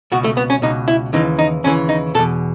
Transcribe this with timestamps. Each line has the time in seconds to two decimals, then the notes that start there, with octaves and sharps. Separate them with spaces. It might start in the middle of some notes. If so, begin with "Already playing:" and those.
0.12 C#2 B2 F#4
0.24 A3
0.37 B3
0.50 C#4
0.62 C#2 B2 D#4
0.88 E4
1.13 D#2 C#3 E3 D#4
1.39 D#4
1.64 D#2 C#3 E3 C#4
1.89 D#4
2.15 B2 A4
2.19 E2